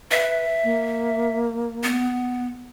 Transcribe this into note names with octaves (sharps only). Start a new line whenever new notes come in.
B4 E5
A#3
B3